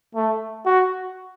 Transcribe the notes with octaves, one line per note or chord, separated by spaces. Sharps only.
A3
F#4